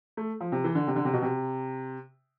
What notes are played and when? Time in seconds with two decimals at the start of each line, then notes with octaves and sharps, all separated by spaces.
0.17 A3
0.40 F3
0.52 C3
0.64 E3
0.75 D3
0.87 C3
0.96 D3
1.05 C3
1.13 B2
1.22 C3